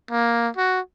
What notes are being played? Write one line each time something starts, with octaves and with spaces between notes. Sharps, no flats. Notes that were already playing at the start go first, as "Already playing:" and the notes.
A#3
F#4